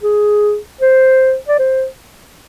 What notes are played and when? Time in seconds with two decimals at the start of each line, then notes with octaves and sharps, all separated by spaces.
0.03 G#4
0.81 C5
1.48 D5
1.59 C5